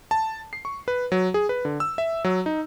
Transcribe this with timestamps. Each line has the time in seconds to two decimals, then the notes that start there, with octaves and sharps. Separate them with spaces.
0.11 A5
0.53 C7
0.65 C#6
0.88 B4
1.12 F#3
1.34 G#4
1.49 B4
1.65 D3
1.80 E6
1.98 E5
2.24 F#3
2.46 D#4